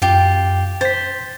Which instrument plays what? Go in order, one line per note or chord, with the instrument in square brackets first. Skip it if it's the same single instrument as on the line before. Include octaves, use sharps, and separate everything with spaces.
[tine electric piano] F#2 [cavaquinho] F4 G4
[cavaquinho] C5 [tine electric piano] A6 B6